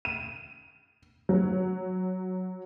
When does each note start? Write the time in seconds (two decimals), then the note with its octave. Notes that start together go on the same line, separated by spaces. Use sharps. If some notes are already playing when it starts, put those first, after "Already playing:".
0.05 D#7
1.29 F#3